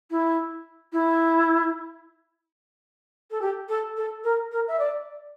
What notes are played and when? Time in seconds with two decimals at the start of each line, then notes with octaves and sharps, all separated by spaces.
0.10 E4
0.92 E4
3.30 A4
3.41 G4
3.68 A4
3.96 A4
4.23 A#4
4.51 A#4
4.67 E5
4.79 D5